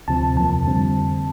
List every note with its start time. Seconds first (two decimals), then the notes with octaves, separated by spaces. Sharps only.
0.08 D2 C3 F3 C4 A5
0.36 E2 C3 F3 A#3 A5
0.65 F2 D3 G3 C4